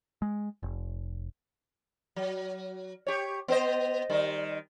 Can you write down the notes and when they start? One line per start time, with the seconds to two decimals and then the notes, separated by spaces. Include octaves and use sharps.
0.22 G#3
0.63 F1
2.16 F#3
3.07 G4 C#5
3.48 B3 C5 D#5
4.10 D#3 G3